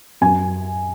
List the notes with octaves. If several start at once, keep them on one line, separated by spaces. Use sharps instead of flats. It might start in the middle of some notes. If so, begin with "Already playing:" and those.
F#2 G#5